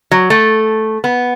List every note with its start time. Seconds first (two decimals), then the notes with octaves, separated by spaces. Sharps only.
0.11 F#3
0.30 A3
1.04 B3